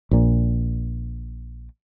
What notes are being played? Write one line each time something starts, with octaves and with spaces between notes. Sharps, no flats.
A#1 A#2